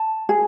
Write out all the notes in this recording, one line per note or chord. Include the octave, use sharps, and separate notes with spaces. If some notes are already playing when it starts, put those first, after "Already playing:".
Already playing: A5
G#4